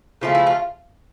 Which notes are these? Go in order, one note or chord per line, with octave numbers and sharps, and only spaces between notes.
C#3 F3 A3 F4
E4
F4